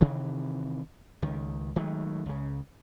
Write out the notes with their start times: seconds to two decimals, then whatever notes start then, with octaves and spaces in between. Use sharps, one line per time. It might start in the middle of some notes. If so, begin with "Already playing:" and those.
0.01 C3 D#3 E3
1.22 C#2 D#3
1.76 D#3 F#3 G#3 A3
2.26 C#2 C#3